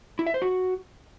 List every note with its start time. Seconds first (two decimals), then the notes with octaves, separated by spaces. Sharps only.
0.19 E4
0.27 E5
0.34 C5
0.42 F#4